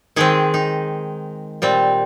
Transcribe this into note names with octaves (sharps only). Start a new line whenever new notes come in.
D#3 G#3 C4 G#4
D#4
A#2 G3 C4